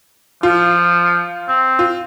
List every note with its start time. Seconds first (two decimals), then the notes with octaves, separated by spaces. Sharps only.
0.43 F3 F4
1.48 C4
1.79 F4